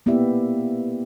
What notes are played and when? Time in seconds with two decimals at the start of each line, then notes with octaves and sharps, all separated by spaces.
0.06 A#3 B3 E4 G4 D5 E5